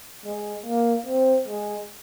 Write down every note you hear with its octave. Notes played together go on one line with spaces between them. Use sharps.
G#3
A#3
C4
G#3